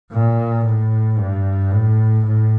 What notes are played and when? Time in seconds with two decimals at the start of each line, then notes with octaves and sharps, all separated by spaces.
0.11 A#2
0.64 A2
1.18 G2
1.71 A2
2.25 A2